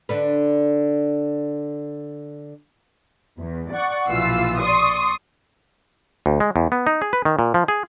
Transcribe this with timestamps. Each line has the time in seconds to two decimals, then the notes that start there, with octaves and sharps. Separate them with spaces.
0.09 D3 D4 B4
3.38 E2
3.72 D5 F#5 C#6
4.09 A#1 B2 E3 F4 E6 C7
4.58 D5 C6 C#6 D#6
6.26 D2
6.40 G#3
6.56 E2
6.72 B3
6.87 D#4
7.02 G#4
7.13 B4
7.25 D#3
7.39 A#2
7.54 F3
7.68 G#4